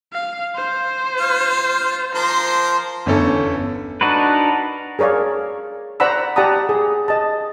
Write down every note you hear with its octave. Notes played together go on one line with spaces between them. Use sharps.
F5
C5
F4 F5
F3 A#4 C5 C6
G1 E2 C#4 A4
D4 D#4 F#4 A#4 B4
G#4 A#4 C#5 D5 F5
C5 D5 F#5 A#5 B5 E6
G4 D5 F#5 A5 A#5 D#6
G#4
D#5 A5